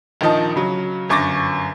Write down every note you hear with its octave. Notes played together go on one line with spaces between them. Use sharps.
A#1 D#3 F3 D#4 D#5 A5
C#3 F#3
G1 F#2 C#6 D6 A6 A#6